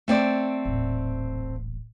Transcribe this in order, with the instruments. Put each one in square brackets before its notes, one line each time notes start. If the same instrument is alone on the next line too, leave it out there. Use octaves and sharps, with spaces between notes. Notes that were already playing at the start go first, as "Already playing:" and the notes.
[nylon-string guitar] A3 C4 D5
[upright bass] D#1 A1